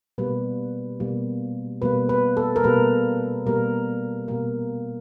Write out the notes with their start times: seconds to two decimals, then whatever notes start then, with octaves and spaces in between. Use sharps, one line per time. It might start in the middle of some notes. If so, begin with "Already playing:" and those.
0.18 B2 G3 A#3 B4
1.00 B2 G3 A#3
1.82 B2 G3 A#3 B4
2.09 B4
2.37 A4
2.56 A#4
2.64 B2 G3 A#3 B4
3.46 B2 G3 A#3 A#4
4.28 B2 G3 A#3 A#4